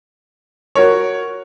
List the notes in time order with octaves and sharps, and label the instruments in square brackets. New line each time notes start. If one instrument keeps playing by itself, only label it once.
[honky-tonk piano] F#4 A#4 C#5